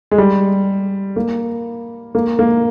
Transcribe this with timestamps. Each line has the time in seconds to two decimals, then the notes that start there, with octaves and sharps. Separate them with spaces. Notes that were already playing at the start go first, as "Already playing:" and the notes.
0.11 G#3
0.18 G3
1.16 A#3
2.15 A#3
2.39 A#3